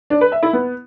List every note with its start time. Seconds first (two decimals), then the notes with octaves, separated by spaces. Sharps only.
0.10 D4
0.21 B4
0.32 E5
0.43 E4
0.53 B3